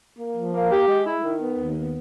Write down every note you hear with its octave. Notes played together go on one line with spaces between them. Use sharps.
A#3
F3
A#3
G4
G#3
E4
D#3
B3
D#2
B3